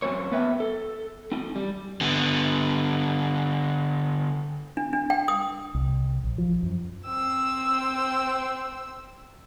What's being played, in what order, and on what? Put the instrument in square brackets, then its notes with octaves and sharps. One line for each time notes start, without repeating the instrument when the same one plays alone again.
[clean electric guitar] F#2 F#3 C4 C5 C#5
B3 B4 E5 F5 G5
A4
C4 D#4
G3
[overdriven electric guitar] D3 B3
[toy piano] D4
D4
G5
D#6
[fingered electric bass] C2
A#1
F3
F#2
[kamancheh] C4 E6